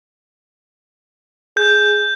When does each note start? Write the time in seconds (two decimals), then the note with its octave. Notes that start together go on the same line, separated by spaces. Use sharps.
1.57 G#4 G6